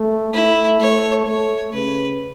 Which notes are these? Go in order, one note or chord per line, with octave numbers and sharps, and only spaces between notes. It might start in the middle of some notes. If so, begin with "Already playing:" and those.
Already playing: A3
A3 E4
A3 C#5
A3 C#5
C#3 B4